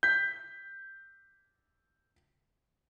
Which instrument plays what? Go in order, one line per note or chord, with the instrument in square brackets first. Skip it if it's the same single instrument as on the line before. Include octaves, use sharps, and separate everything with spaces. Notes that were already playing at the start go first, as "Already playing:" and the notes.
[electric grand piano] G6 B6